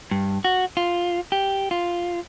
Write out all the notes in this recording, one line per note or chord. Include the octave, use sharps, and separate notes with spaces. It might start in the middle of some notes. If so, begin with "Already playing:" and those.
G2
F#4
F4
G4
F4